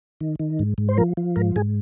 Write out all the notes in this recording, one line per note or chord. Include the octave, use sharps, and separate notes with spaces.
D#3
D#3
G#2
G#2
C5
F3 A#4
F3
G#2 A#4
G#2 G#4